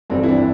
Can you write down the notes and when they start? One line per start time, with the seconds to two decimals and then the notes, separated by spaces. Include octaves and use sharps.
0.10 G1 F2 E3 G3 C4
0.23 E4
0.29 D4